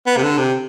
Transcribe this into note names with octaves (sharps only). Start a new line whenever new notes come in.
B3
C3
D3
C3